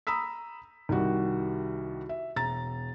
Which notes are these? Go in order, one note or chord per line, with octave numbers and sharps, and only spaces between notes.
A#5 B5 D#6 E6 B6
C2 D#3 G3 F#4
E5
E1 A#5 A6